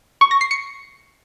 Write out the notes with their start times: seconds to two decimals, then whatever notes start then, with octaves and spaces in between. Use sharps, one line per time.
0.21 C#6
0.31 A#6
0.41 C7
0.51 C#7